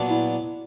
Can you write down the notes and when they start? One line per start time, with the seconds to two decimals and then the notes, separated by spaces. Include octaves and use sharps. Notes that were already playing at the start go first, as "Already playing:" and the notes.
Already playing: A#2 F#3 B3 D4
0.10 E4